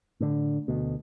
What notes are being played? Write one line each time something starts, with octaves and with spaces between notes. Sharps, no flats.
A2 D3
D2 B2